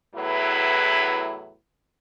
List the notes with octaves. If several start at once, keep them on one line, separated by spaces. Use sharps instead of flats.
E2 A2 F#3 E4 B4